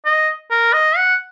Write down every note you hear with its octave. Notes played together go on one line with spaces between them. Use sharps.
D#5
A#4
D#5
F#5